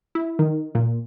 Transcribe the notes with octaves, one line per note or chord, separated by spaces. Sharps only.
E4
D#3
A#2